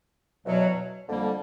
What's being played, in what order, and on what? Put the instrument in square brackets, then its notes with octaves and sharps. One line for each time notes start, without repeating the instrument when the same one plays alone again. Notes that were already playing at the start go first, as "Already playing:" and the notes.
[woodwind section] E2 B2 F#3
F2 D3 G3 A#3